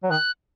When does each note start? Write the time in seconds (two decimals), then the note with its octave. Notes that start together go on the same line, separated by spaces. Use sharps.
0.04 F#3
0.10 D#3 F#6